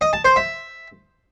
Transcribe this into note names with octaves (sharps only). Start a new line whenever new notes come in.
D#5
A5
C5
E5